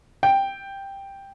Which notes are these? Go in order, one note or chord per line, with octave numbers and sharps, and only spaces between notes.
G5